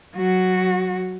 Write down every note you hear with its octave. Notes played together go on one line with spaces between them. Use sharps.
F#3 F#4